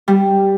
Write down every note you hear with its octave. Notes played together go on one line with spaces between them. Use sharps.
G3